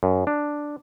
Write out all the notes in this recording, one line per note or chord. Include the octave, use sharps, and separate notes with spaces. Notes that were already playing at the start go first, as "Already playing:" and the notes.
F#2
D4